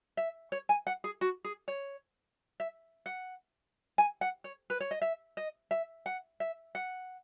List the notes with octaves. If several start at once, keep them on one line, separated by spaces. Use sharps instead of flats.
E5
C#5
G#5
F#5
G#4
F#4
G#4
C#5
E5
F#5
G#5
F#5
C#5
B4
C#5
D#5
E5
D#5
E5
F#5
E5
F#5